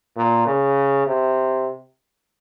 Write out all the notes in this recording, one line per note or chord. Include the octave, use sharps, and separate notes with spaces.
A#2
C#3
C3